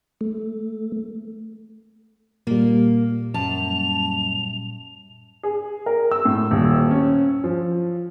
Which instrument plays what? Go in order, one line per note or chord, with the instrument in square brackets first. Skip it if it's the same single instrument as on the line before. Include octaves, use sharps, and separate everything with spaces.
[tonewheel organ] A3
[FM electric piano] A#2 G3 [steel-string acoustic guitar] A#3
[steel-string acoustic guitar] F#2 A5 [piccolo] F7
[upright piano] G#4
A#4
E6
A2
D#1
C#4
F3